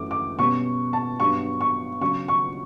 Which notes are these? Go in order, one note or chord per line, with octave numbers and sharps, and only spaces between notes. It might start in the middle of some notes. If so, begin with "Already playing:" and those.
Already playing: F#2 E3 A3 C#4 D6
D6
B2 G3 C#4 C#6
A5
G2 F#3 B3 D4 C#6
C#6
C#3 F#3 C#4 C#6
C#6